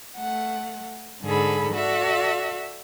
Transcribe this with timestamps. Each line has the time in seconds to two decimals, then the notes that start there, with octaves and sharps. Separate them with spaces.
0.15 A3 F#5
1.23 G#2 D3 G#4 A4 B5
1.73 F#4 A4 D5 E5